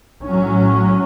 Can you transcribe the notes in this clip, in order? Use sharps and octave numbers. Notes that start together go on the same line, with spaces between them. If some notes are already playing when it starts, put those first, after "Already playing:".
A2 F#3 C#4